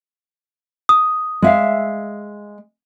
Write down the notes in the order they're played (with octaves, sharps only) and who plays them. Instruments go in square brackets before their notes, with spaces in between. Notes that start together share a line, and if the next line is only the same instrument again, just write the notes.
[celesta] D#6
[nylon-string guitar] G#3 E5 F5